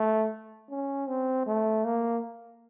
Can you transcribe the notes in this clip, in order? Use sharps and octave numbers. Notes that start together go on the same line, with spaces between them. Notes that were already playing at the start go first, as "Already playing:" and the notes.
Already playing: A3
C#4
C4
A3
A#3